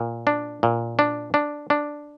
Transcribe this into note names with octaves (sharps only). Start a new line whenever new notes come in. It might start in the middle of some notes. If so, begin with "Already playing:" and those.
Already playing: A#2
D4
A#2
D4
D4
D4